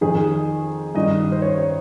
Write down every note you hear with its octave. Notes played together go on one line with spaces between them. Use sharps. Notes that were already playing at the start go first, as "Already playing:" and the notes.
F2 D#3 G#4
G2 D#3 D#5
C5
C#5
C#5